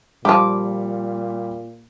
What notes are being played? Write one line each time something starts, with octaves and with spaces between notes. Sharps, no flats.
A#2 F3 G3 G4 D6